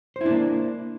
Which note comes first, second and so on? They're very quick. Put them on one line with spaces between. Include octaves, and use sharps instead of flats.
C5 E4 D4 A#3